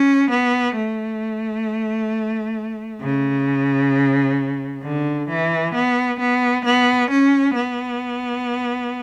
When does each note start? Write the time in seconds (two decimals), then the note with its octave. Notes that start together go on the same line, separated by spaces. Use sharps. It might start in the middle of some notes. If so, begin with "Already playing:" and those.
Already playing: C#4
0.30 B3
0.75 A3
3.01 C#3
4.82 D3
5.29 E3
5.74 B3
6.20 B3
6.65 B3
7.10 C#4
7.55 B3